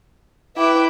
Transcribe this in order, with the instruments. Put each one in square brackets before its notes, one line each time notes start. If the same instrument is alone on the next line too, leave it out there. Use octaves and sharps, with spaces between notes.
[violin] E4 G5 [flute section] B4 D6